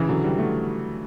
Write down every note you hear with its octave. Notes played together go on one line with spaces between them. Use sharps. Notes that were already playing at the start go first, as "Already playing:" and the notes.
Already playing: C#3 E3
D3 F#3
E3 G3
F#3 A3